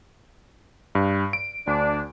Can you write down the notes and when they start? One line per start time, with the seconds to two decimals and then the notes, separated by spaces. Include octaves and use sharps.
0.95 G2
1.33 D7
1.67 D2 D4